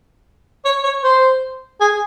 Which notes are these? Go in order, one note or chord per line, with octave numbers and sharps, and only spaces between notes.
C#5
C#5
C5
G#4